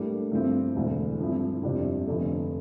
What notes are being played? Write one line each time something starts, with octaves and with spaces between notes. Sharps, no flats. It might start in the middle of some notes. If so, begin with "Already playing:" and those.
Already playing: A2 G3 A#3 D4
G2 F3 A3 C4 E4
E1 D2 D3
G2 F3 C4 E4
G1 F2 C3 G3 D4
F1 F2 D3 A3